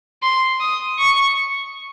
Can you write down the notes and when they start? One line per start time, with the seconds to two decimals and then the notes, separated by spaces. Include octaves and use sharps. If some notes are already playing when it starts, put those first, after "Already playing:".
0.22 C6
0.60 D#6
0.99 C#6